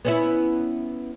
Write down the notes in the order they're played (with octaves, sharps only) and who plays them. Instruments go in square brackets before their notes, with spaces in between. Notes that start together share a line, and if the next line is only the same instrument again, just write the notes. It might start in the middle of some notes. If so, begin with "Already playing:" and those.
[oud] B3 C#4 E4